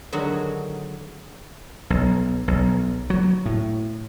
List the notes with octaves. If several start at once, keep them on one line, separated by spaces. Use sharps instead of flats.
D3 D#3 F#3 G#3 F#4
B1
B1
F#3
A2